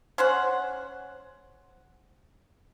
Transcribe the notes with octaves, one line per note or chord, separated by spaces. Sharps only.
C#4 C5 F#5